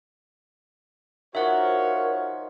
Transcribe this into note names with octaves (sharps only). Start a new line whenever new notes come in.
D#3 F3 F4 F#4 A#4 C#5 E5 F#5